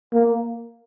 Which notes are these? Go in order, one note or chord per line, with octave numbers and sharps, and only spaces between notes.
A#3